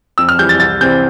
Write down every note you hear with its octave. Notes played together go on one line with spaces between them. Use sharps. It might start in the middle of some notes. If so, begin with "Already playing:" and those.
F2 E6
F6
E3 G3 G6
A6
C2 A6
C3 E3 G3 C4 G6